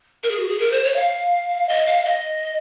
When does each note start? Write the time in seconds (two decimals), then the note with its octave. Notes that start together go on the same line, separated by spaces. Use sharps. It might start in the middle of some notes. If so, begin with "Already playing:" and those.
0.24 A#4
0.31 G#4
0.40 F#4
0.49 G#4
0.60 A#4
0.72 C5
0.84 C#5
0.96 F5
1.69 D#5
1.87 F5
2.05 D#5